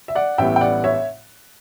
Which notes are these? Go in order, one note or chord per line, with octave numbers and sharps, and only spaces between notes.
E5
D5 F#5
A1 A2 G3 B3 E5 G5
G5
D5 F#5
C#5 E5